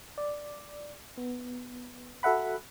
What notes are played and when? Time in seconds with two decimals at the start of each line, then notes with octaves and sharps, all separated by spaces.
0.18 D5
1.17 B3
2.23 F#4 A4 E5 F#5 B5